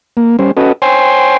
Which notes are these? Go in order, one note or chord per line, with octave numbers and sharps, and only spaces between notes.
A#3
G3 C#4 C5
C#4 F#4 A4 B4 D#5
C5 C#5 G5 G#5 C6